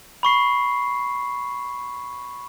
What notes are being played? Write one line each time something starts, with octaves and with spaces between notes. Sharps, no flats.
B5 C#6 C7